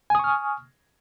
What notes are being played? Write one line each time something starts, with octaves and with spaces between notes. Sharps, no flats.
G#5 C#6 D#6 F6